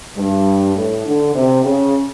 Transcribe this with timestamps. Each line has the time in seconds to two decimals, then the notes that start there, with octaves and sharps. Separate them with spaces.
0.17 G2
0.76 A2
1.06 D3
1.35 C3
1.64 C#3